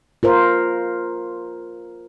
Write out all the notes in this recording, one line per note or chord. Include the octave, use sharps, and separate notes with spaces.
F4 A#4 C5